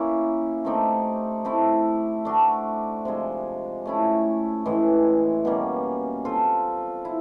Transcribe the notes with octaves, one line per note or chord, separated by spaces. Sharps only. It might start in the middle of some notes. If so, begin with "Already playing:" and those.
Already playing: A#3 C#4 E4
A3 C4 D#4 G4
A3 C4 E4
A3 D4 F#4
C3 F3 G#3
A3 C#4 E4
A2 E3 G#3
B2 G3 A#3 C#4
C4 F4 A4
E4